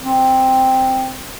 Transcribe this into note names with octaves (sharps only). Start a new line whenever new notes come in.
C4